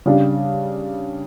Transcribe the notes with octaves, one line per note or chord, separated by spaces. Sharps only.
C#3 G3 D4